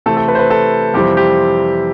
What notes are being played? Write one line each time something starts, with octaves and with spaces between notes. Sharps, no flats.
C3 E3 A3 C4 A4
A4
B4
C5
B4
A4
F2 C3 E3 G3 C4 G4
G4